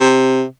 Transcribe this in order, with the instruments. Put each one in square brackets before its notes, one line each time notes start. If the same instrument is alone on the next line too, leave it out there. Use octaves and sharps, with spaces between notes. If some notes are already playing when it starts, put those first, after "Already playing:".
[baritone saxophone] C3